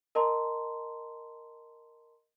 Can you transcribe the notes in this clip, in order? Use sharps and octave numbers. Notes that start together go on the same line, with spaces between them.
A#4 D#5 A5 A#5 C6